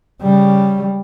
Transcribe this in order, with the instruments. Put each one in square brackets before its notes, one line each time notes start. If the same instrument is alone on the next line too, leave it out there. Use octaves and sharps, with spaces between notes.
[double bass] C#3 G3